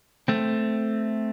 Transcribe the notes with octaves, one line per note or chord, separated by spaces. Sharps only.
A3 C4